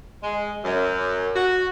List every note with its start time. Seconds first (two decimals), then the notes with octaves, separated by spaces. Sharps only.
0.22 G#3
0.65 F#2
1.36 F#4